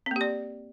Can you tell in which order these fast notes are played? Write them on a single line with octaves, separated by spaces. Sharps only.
C4 A#3 G4 D5